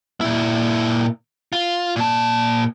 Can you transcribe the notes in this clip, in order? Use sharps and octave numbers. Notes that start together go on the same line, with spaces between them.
A#2 E4
F4
A#2 A5